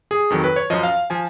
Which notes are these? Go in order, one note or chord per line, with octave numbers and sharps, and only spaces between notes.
G#4
F2 D#3 F#3
B4
C#5
F#2 F3 D#5
F5
F3 G#5